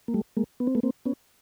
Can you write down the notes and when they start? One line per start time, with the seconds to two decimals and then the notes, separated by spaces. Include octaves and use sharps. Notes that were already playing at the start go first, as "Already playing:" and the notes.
0.08 A#3
0.14 G3 A3
0.37 G#3 A#3
0.60 B3
0.67 C4
0.75 A3 B3
0.83 A#3 C4
1.05 B3 C#4